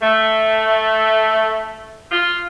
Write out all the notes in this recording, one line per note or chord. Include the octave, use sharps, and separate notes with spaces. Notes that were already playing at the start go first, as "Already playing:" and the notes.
A3
F4